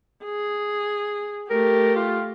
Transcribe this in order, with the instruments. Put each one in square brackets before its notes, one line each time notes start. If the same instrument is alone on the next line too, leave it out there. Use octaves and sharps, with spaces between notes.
[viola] G#4
[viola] A3 G4 [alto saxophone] A#4
[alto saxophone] F4